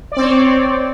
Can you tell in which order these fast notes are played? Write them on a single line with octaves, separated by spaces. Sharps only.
D5 C4 C#5